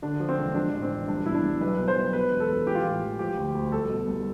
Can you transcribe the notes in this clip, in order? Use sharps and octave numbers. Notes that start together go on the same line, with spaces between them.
D3 D4
F3
C4
E1
F3 D4
A1
C4
A1
C2 D4
B2 E4
D4
C2
B1 B4
B2
C5
B1
B2 B4
E1
A4
E1
E3 G4
F4
A1 G4
A1
F3 G4
D2
D2
C2 A4
B2
C2